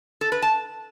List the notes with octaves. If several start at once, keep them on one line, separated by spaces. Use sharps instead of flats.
A4
B4
A5